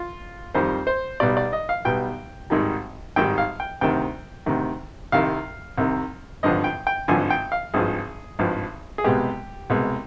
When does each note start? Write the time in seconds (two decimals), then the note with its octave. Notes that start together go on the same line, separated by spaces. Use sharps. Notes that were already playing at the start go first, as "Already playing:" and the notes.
Already playing: F4
0.54 F2 D#3 G3 C5
0.87 C5
1.20 B1 B2 G3 D5
1.37 D5
1.53 D#5
1.69 F5
1.85 B1 B2 G3 G5
2.50 G#1 G#2 D#3 G3
3.16 G#1 G#2 D#3 G3 G5
3.38 F5
3.60 G5
3.81 D2 C3 D#3 G5
4.46 D2 C3 D#3
5.12 C2 C3 D#3 F5
5.78 C2 C3 D#3
6.43 G#1 G2 D3 F3 D#5
6.64 G5
6.87 G5
7.08 G#1 G2 D3 F3 G#5
7.30 G5
7.52 F5
7.74 G#1 G2 F3 G#4
8.39 G#1 G2 F3
8.98 G#4
9.04 C2 B2 G#3 G4
9.70 C2 B2 G#3